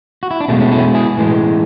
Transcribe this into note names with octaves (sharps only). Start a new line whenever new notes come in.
F#4
E4
D4
B2 G#3 A3 C#4
A3 C#4
C#4 E4
E4 G#4
A2 E3 G#3